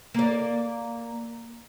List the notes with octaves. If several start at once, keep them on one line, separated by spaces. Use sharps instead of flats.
A#3 D5